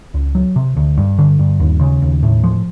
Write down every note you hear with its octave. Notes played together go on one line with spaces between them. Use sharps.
C#2
F#3
C3
D2
G2
D3
G2
D#2
C#3
D#2
A2
F3